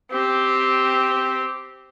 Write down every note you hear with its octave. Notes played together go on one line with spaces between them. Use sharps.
C4 G4